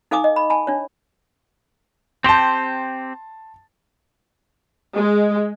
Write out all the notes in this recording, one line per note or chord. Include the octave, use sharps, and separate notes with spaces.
D#4 A4 F5 G#5 D6 D#6
D#5
B5
G#5 A5 B5
D4 C#5
C4 G4 C5 A5 C6
G#3